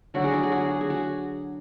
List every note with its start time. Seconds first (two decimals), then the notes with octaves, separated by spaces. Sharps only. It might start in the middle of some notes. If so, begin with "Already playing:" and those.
0.14 D3 F#3 D4 F#4
0.24 G#4
0.34 F#4
0.43 G#4
0.52 F#4
0.61 G#4
0.70 F#4
0.81 G#4
0.90 F#4